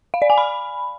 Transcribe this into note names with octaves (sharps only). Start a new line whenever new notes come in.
F5
D5
G#5
B5